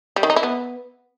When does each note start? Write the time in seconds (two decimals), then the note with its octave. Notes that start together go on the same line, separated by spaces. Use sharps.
0.16 G3
0.23 D#3
0.30 D#4
0.36 E4
0.43 B3